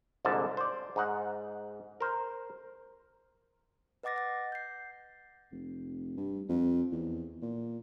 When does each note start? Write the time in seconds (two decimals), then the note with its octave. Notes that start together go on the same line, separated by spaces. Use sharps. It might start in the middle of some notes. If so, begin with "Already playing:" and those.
0.25 C2 F2 G#2 D3 A5
0.57 C5 D5
0.96 G#2 D#4 F#5
2.00 A#4 C5
4.03 B4 D#5 F#5 D6 A6 A#6
4.16 F#5 A6
4.52 G6 C7
5.52 F1
6.17 G2
6.49 F2
6.92 E2
7.42 A#2